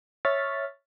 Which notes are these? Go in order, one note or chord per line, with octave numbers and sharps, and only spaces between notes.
C#5 E5 C#6 F6 A6 B6